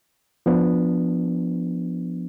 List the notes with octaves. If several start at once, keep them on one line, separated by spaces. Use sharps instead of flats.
F3 B3 D4